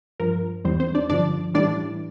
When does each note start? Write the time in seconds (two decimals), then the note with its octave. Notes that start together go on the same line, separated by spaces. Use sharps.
0.20 G2 F3 A#4
0.64 E2 E3 G3 C4 C5
0.80 C4 C5
0.95 D4 D5
1.09 G2 D3 F3 D4 D5
1.54 A2 E3 G3 D4 D5